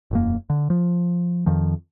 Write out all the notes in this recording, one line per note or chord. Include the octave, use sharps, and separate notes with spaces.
E1 F#2 A#3
D3
F3
F2 D#3 F3